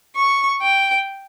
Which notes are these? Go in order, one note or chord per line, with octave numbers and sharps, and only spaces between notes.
C#6
G5